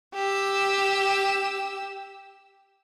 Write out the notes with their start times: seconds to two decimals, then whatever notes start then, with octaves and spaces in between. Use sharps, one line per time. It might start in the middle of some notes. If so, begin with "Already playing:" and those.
0.14 G4 E6